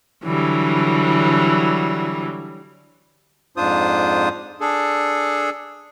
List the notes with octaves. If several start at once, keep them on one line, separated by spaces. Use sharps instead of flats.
D3 E3 F#3 G3
F2 G#2 D4 F4 C5 D#6
D4 G#4 A4